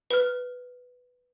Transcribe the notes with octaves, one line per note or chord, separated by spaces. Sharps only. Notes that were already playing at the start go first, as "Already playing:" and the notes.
B4 F6